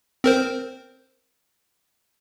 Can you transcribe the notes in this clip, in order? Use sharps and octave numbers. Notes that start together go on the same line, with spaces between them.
C4 A#4 C5